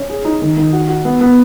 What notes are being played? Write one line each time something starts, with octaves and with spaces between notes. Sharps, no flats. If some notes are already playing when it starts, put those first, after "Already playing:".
Already playing: C#4
G#4
D#4
D#3
D#3
F#4
F#4
B3
B3